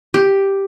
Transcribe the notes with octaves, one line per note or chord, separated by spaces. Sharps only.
G4